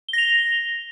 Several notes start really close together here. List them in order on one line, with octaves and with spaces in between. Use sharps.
G7 A#6 F7